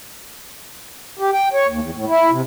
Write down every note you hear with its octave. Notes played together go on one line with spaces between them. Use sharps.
G4
G5
C#5
D#2
E2
A2
E4
C3